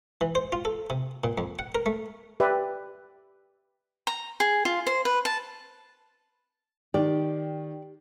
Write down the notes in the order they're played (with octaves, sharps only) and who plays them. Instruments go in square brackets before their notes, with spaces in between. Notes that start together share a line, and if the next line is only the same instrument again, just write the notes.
[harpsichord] E3
C5
F4
A4
C3
A#2
F2
F#5
A#4
A3
[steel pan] G4 B4 D5 E5
[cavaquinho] A#5
G#4
F4
C5
B4
A5
[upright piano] D#3 [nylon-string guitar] G4 [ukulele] D5